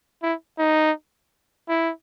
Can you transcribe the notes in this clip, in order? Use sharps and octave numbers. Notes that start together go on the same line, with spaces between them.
E4
D#4
E4